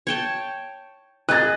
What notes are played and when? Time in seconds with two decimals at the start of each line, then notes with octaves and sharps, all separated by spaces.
0.07 C#5 G5 A5
1.29 G#4 D#5 F#6 A6